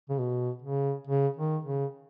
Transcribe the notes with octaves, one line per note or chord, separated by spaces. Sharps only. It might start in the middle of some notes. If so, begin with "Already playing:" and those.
C#3
B2
C#3
C#3
D#3
C#3